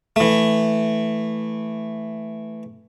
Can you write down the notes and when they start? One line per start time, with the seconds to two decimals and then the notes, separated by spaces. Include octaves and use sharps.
0.16 E3 A3